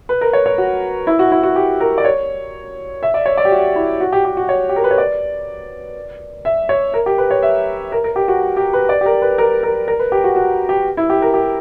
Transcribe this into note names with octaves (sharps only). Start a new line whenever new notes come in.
B4
A#4
C#5
C#5
F#4
E4
F#4
E4
F#4
G4
A#4
D5
C#5
E5
D5
C#5
D5
G4
F#4
E4
F#4
G4
G4
F#4
C#5
G4
A#4
B4
C#5
D5
E5
C#5
A#4
G4
B4
C#5
E5
A#4
A#4
G4
F#4
G4
B4
D5
G4
A#4
B4
A#4
A#4
A#4
B4
G4
F#4
F#4
G4
E4
G4
A#4
G4